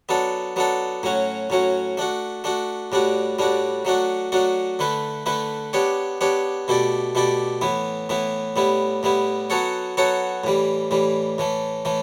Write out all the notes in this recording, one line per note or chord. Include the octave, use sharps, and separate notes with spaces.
F#3 B3 D4 A4
F#3 B3 D4 A4
A2 F#3 C#4 F#4
A2 F#3 C#4 F#4
A3 D4 F#4
A3 D4 F#4
A2 G3 D4 F#4
A2 G3 D4 F#4
F#3 A3 D4 F#4
F#3 A3 D4 F#4
D3 A3 E4 B4
D3 A3 E4 B4
B3 D4 G4 C#5
B3 D4 G4 C#5
B2 A3 E4 G4 D5
B2 A3 E4 G4 D5
A2 E3 B3 E4
A2 E3 B3 E4
A2 G3 B3 E4
A2 G3 B3 E4
F#3 B3 F#4 A4 C#5
F#3 B3 F#4 A4 C#5
A2 E3 G3
A2 E3 G3
A2 E3 A3
A2 E3 A3